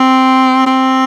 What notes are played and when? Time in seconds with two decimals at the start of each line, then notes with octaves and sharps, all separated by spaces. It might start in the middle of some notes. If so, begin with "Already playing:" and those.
Already playing: C4
0.66 C4